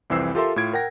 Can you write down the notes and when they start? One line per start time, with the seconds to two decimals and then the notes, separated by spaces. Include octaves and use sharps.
0.10 C2 F2 E3 C4 E6 C7
0.35 F4 G4 A4 A#4 E5 C6
0.56 A2 F4 G#6 D7
0.73 A#4 F#5 G5 A#6